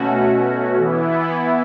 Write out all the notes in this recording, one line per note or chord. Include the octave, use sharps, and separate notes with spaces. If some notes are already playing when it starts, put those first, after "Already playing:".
Already playing: B2 A3 C#4 F#4
E3 B3 E4